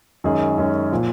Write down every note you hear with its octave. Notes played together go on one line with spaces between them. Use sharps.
F#2 D#3 G#3 C#4 G#4
F#2 D#3 G#3 C#4 G#4
A#2 F3